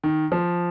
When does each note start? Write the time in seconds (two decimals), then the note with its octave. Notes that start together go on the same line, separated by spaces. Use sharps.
0.04 D#3
0.32 F3